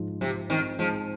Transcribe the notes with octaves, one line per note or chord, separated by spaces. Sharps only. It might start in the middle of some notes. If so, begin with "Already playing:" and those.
Already playing: G#2 F3 G#3
C3 F3
D#3 C4
F3 G#3